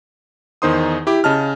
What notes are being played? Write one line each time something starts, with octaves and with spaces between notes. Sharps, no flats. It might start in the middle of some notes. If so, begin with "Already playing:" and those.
E2 D#3 D#4 C5 C6 D#6
E4 G4 D6
C#3 D#5 A5 F6